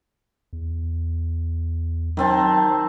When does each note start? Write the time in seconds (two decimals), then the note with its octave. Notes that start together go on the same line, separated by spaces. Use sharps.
0.53 E2
2.17 D#3 F#3 C4 A5